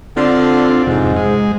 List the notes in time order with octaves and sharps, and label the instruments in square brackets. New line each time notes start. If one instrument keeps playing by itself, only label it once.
[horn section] D3 [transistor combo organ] C4 D4 F4
[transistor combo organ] F2 C3 [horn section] G#2
[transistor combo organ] G#3